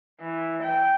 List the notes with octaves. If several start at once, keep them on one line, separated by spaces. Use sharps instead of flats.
E3
G5